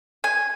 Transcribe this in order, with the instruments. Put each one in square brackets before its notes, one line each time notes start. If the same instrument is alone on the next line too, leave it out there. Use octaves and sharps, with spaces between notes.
[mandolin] G#5